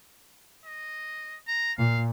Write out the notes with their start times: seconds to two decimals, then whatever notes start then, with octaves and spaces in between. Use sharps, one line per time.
0.65 D#5
1.47 A#5
1.78 A#2 F5